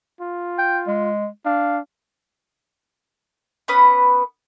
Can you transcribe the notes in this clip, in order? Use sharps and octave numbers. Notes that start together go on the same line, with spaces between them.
F4
G5
G#3
D4 F5
B3 C#4 B4 D#6